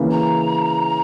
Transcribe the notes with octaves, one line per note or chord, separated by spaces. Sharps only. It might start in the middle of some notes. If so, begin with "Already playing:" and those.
Already playing: C#3 E3 A#3
A#5